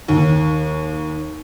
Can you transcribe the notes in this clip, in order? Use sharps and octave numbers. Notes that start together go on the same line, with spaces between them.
D#2